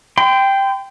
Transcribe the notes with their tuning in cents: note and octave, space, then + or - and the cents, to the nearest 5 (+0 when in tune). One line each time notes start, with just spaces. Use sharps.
G5 +0 C6 -35